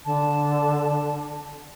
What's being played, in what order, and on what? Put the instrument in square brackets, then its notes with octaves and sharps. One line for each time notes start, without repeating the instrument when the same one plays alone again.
[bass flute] D3 [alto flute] A5